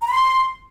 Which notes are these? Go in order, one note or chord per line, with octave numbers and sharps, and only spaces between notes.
A#5
B5
C6